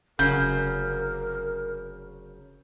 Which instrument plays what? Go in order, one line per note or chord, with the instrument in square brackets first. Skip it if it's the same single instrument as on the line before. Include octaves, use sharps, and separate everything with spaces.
[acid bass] F1 [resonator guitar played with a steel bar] C#3 F#3 [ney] A#4 [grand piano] G6